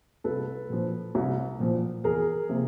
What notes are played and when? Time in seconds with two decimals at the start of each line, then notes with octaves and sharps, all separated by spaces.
0.24 C2 A4 B4
0.70 A#2 F3
1.15 C2
1.60 A#2 F3
2.04 E2 G#4 A#4
2.49 C3 F3 A#3